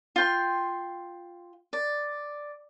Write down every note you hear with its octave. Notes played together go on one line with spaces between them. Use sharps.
F4 G5 C6
D5